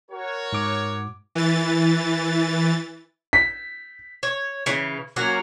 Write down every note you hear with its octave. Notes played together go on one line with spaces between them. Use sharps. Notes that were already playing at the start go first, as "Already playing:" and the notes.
F#4 A#4 C#5
G#2 D6
E3 A6
B6
C#5
C#3 E3
F#3 A#3 C#4 F#4